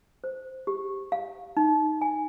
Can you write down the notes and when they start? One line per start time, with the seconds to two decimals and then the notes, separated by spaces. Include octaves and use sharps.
0.24 C5
0.67 G4
1.12 F5
1.57 D#4
2.02 G#5